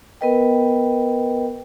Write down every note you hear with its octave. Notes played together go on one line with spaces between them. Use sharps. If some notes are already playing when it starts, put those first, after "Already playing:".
B3 A#4 B4 D#5 G5